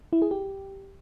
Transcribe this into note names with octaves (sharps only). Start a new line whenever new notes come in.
E4
G#4
G4